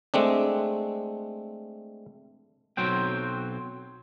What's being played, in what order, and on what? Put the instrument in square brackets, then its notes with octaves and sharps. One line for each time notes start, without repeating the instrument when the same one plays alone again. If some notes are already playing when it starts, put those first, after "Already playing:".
[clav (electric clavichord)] G#3 A3 C4 D4
[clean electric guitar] B1 F#3 C4 G5